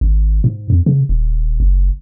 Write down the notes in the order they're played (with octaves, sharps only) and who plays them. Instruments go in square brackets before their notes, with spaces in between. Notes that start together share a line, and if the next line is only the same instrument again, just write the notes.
[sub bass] G#1
G#2
F2
C#3
D#1
F#1